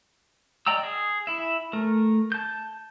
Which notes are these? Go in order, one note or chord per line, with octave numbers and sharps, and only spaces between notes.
D5 D#5 G5 A#5 E6
G#4
E4 E5
A3 A#4
A5 G6